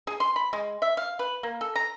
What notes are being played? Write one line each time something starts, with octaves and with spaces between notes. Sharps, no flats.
G#4
C6
B5
G#3
E5
F5
B4
A#3
A4
A#5